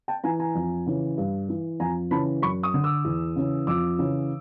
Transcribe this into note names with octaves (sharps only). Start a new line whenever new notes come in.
G5 A5
E3 G#5 A#5
G#5 A#5
F2
C#3 E3
G2
E3
F2 G#5 A#5
C#3 E3 A5 B5
F#2 B5 C#6
C#6 D#6
D3
D6 E6
E2
C#3 E3
F2 D6 E6
C#3 E3